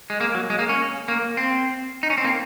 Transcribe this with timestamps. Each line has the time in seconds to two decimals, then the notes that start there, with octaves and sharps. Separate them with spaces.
0.10 G#3
0.21 A#3
0.35 F#3
0.50 G#3
0.59 A#3
0.69 C#4
1.08 A#3
1.37 C4
2.03 D#4
2.10 C#4
2.18 C4
2.25 A#3